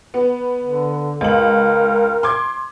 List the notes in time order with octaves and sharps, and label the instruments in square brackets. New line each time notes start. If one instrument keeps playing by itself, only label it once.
[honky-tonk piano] B3
[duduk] D3
[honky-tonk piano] C#2 F#7 [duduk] A#4
[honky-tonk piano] C6 D6 G#6